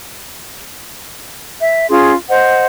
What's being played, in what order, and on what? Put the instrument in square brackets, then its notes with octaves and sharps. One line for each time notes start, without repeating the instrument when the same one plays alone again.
[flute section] E5
C#4 F4 G#4 C6
C5 D#5 F#5